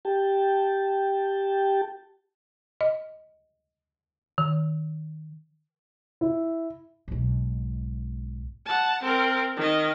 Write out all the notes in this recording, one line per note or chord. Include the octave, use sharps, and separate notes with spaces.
G4 G5 A5
D#5
D#3
E4
B1 G#2
F#5 A5
C4 A#4
D#3 D#5